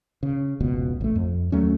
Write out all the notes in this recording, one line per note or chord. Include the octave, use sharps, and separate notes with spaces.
C#3
F1 C#2 B2
A1 A3
F2
D#2 F#3 A3 C#4